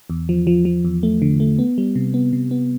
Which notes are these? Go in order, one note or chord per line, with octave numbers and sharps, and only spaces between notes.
E2
F3
F3
F3
E2
A3
D3
A3
B3
G3
C3
B3
C3
B3